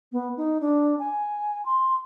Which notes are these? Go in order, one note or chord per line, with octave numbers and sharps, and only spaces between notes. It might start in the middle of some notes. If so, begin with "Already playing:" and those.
B3
D#4
D4
G#5
C6